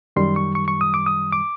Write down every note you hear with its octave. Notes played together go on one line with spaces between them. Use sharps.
F#2 D#3 G3 C6
C#6
C#6
C#6
D#6
D6
D#6
D6